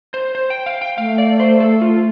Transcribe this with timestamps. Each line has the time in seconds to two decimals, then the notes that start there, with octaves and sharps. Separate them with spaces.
0.14 C5
0.35 C5
0.50 G5
0.66 F5
0.81 G5
0.98 A3 F5
1.18 D5
1.40 C5
1.60 A4
1.81 F4